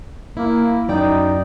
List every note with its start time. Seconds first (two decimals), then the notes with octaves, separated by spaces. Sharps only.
0.37 A#3 E4
0.88 F#2 D#4 D5 G5